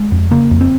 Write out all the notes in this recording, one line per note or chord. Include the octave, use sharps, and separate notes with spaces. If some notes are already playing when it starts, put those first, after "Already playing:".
Already playing: G#3
F2
C#3 A#3
F2
C4